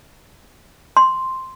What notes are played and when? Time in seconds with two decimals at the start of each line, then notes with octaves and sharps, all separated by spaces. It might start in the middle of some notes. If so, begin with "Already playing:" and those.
0.97 C6